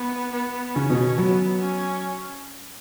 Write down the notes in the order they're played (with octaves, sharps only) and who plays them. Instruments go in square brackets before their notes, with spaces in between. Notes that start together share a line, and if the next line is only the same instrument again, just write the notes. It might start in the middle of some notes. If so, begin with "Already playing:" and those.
Already playing: [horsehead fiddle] B3
B3
[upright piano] C#3 [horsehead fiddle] C#4
[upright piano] B2
[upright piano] F#3 [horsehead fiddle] B3
[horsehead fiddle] C#4